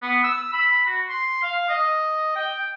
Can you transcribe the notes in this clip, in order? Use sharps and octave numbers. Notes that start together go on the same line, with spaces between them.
B3
E6
B5
F#4
C6
F5
D#5
G5